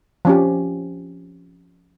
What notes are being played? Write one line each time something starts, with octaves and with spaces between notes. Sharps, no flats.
F3 C#4 G4